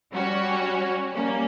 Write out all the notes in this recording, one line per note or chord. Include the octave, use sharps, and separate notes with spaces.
G3 C#4 F#4 C#5
G3 A#3 C#4